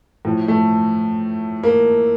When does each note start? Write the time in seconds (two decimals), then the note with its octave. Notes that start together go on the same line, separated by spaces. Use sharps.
0.25 A2 F3
0.48 A3
1.63 A#3